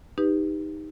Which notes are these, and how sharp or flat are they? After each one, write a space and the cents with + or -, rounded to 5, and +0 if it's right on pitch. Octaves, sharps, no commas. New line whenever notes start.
D#4 +0 G4 +20 B4 +0